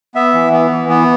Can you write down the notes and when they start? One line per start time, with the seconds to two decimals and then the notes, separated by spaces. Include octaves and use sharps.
0.15 B3 E5
0.34 E3
0.52 B3
0.71 E3
0.89 B3